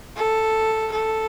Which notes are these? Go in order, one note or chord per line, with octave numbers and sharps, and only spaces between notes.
A4
A4